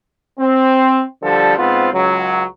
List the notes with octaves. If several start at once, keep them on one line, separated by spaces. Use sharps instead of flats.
C4
D3 F3 G3 A4
G#2 B3 C4 F4
C#2 F#3